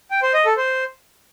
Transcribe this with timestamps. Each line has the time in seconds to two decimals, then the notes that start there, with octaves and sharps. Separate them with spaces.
0.11 G5
0.22 C5
0.34 D#5
0.45 A4
0.57 C5